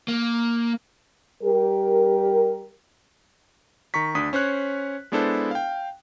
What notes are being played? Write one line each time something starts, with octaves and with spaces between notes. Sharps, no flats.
A#3
G3 G4 A#4
D#3 A#5 C#6 B6
D2 D4 D#6 B6
C#4 C5 C#5 F#6
G#3 B3 D4 E4 A4 C5
F5 G5